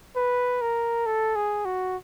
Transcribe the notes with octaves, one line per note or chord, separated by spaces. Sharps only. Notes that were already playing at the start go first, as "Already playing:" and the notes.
B4
A#4
A4
G#4
F#4